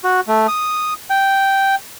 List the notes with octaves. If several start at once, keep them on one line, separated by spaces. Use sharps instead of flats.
F#4
A3
D#6
G5